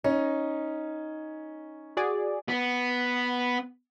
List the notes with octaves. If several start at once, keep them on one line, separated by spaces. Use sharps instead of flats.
C#4 D#4
F#4 G#4 D5
B3